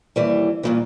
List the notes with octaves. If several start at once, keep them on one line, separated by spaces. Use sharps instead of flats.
D#2 E3 G3
G2 A#2 E3